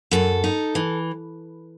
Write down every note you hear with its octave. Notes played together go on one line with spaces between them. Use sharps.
F#2 A4
D#4
E3